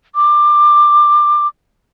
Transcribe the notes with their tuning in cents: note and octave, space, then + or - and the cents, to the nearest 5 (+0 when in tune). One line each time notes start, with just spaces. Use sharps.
D6 +20